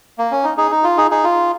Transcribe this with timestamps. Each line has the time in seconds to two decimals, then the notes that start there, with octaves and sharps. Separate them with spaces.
0.19 A#3
0.31 C#4
0.44 D#4
0.58 D#4 G#4
0.71 D#4
0.84 F4
0.97 D#4 G#4
1.11 D#4 G#4
1.24 F4